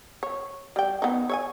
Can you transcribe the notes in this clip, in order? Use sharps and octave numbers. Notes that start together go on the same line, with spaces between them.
C#5
G3 G5
B3 D#4
C#5 E5 G#5